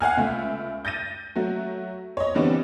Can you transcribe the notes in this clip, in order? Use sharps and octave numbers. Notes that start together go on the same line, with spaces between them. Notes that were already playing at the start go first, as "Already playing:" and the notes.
F5 F#5 G#5 F6
C#2 A3 E5
G6 A6 A#6 D#7
F#3 A3 F#4
C#5 D#5
D3 E3 G3 B3 C4 D4